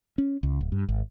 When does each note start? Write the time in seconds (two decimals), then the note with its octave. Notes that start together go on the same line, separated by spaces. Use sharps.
0.18 C#4
0.43 C#2
0.61 D1
0.72 G2
0.88 G#1